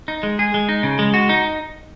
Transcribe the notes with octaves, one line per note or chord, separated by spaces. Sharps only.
D#4
G#3
G#4
G#3
D#4
C#3
G#3
F#4
D#4